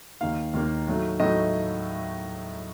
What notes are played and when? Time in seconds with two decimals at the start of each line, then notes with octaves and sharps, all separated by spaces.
0.21 D#2 D#3 A#3 D#4 F5
0.54 D#2 D#3 A#3 D#4
0.87 A2 F#3 A3 D#4
1.20 A2 F#3 A3 D#4 D#5